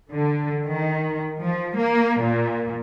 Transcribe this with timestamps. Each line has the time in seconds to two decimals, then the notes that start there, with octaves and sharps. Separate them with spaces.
0.11 D3
0.67 D#3
1.40 F3
1.77 A#3
2.21 A#2